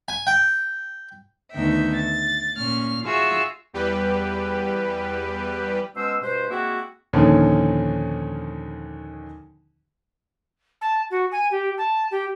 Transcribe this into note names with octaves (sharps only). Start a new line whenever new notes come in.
G#5
G5
D2 D#3 B3 D#4 E5 G5
A6
A#2 C#4 F6
F4 F#4 G#4 E5 E6
E2 G3 G4 B4
B2 G#3 C#4 C5 E6
G2 B2 B4 C5
G#3 A#3 C4 E4 F#4
D#2 A#2 D3 D#3 F3 C#4
A5
F#4
G#5
G4
A5
G4